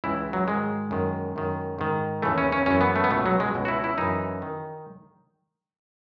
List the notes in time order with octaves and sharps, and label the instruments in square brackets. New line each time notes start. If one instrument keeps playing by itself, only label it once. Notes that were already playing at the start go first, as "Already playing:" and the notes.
[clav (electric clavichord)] C#2 C#3 E3 E4
F#3
G#2 D#3 G#3
F#2 D#3
F#2 D#3
G#2 D#3
D#2 C#3 E3 A3
C#4
C#4
F#2 E3 C#4
B3
A3
B3
C#2 B2 A3
F#3
G#3
C#2 B2
F#4
E4
E4
F#2 E3 D#4
D#3